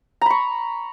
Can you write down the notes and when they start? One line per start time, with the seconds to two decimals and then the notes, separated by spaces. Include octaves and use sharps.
0.21 A#5
0.26 B5
0.30 C#6